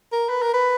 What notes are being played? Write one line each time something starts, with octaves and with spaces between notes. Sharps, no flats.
A#4
B4
A#4
B4